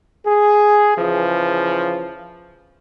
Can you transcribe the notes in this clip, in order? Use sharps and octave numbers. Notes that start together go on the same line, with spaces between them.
G#4
C#3 E3 F3